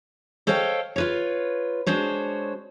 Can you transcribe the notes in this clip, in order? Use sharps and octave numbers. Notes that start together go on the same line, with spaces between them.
A4 C5 C#5 D#5 F5 G5
F4 B4 C#5
G#3 D4 F#4 C5 C#5